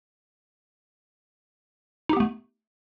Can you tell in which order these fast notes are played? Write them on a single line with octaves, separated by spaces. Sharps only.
D#4 G4 B3 A3